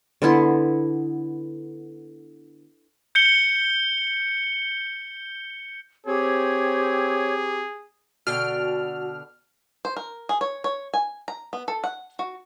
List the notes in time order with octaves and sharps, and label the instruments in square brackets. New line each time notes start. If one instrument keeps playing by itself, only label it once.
[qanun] D3 B3 E4 C6
[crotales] G6 C#7 G7
[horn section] C4 [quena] G4 [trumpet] G#4 [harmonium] C#5
[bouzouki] B2 D3 G5 [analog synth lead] F#4 [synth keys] F6
[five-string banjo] C5
A#4
G#4
C#5
C#5
G#5
A#5
B3
A4
F#5
F#4